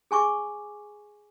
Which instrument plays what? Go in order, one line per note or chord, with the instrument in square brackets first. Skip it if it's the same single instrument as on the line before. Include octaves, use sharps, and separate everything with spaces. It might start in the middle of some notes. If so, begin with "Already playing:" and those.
[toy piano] G#4 G#5 C#6 D6